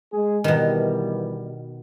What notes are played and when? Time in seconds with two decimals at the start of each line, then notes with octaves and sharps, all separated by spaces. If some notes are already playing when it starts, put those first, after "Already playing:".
0.13 G#3 G#4
0.44 B2 D#3 E3 G3